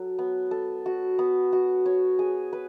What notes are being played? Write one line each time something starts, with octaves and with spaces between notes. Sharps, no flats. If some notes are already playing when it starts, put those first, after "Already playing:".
Already playing: F#3 A4
B3
A4
F#4
B3
F#4
C#5
G#4
B4